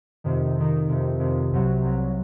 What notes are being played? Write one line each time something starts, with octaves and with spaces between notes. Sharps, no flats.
F2 C3 D#3
F2 C3 D#3
F2 C3 D#3
F2 C3 D#3
C2 C3 F#3
C2 C3 F#3